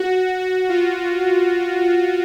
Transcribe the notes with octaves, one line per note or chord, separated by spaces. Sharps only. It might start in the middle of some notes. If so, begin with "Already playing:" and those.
Already playing: F#4
F#4
F4